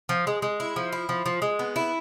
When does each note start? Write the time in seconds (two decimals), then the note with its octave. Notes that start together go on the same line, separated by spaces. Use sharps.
0.09 F3
0.27 G#3
0.42 G#3
0.60 E4
0.76 F3
0.93 E4
1.09 F3
1.26 F3
1.42 G#3
1.59 B3
1.76 E4